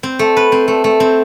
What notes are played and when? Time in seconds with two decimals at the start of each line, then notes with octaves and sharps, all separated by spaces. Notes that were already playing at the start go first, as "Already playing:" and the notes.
0.03 C4
0.19 A3
0.37 B4
0.52 C4
0.68 A3
0.84 A3
1.00 C4